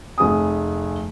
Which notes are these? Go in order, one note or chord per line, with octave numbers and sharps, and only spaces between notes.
F1 G#4 G#5 D#6